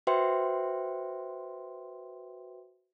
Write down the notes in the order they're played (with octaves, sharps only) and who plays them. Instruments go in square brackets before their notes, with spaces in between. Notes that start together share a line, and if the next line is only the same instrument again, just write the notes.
[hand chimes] F#4 B4 C5 E5 G5 C6